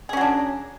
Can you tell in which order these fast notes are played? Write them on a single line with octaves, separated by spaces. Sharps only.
G#4 C#4 F#3 D4